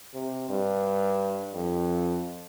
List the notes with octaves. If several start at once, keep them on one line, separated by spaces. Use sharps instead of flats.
C3
G2
F2